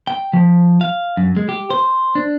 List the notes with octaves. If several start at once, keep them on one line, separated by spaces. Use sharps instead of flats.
G5
F3
F5
F#2
G#3
G4
C5
D4